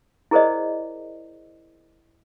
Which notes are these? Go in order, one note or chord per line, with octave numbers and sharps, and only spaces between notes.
E4 G#4 A#4 C5 D5 D#5